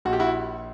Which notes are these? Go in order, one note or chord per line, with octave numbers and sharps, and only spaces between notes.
A#1 F#4
G4
E4 F#4